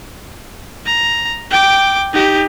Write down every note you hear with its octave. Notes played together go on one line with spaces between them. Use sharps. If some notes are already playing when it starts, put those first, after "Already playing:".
A#5
G5 D6
D#4 G4